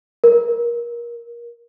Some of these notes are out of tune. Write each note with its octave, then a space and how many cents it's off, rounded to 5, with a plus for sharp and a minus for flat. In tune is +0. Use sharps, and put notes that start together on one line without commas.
A#4 +25